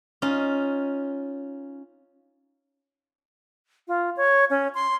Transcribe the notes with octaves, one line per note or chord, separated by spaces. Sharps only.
C#4 D#4 F4
F4
C#5
C#4
C6